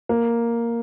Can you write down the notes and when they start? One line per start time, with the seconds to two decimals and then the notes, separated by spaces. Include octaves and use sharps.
0.09 A#3